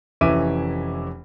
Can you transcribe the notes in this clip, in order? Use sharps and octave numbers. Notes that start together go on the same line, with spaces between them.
F1 E3 C#4 E5 D6 D#7